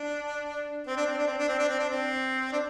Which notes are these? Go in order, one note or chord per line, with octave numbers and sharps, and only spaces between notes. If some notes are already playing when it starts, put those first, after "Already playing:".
Already playing: D4
C4
D4
C4
D4
C4
D4
C4
D4
C4
D4
C4
D4